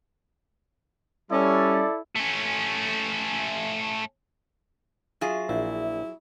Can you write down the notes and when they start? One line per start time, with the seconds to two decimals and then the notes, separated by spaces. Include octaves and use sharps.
1.31 G3 C#4 E4 A4 D5
2.16 A3 C#4
5.21 F#3 F4 G#4 E5
5.49 A#1 E4